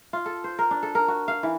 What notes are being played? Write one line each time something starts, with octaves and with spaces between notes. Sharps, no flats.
F4
A4
C5
A#4
D4
A4
A#4
F#4
F5
E3